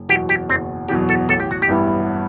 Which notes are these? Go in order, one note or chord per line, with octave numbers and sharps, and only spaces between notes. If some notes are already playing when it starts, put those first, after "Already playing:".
Already playing: F#1
E2 B2 F#3 G4
G4
F#1 C4
E2 B2 F#3 G4
A4
A1 A4
G4
F#4
G4
G2 E3 B3 E4